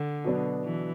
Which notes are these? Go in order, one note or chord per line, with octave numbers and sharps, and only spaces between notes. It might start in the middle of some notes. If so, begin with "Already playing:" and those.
Already playing: D3
B2 F#3 B3 D4
E3